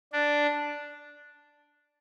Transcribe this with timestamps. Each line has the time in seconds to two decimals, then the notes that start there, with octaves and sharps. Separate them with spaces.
0.13 D4